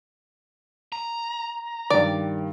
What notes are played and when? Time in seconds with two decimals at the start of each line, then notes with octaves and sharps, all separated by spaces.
0.92 A#5
1.90 G2 D#3 D5